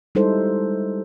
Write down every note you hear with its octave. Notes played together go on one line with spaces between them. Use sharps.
G3 G#3 D#4 E4 A4 C5